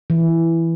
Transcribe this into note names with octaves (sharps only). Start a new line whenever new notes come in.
E3